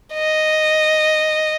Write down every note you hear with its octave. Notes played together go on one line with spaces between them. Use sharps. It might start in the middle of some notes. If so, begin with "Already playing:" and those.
D#5